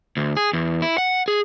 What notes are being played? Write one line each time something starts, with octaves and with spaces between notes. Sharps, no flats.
D2
G#4
E2
E4
F#5
G#4